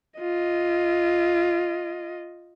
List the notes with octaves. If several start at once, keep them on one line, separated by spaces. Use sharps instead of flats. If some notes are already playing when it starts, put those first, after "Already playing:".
F4 D#5